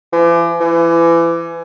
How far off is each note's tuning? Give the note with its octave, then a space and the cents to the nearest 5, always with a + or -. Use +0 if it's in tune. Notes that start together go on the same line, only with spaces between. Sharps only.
E3 +45
E3 +30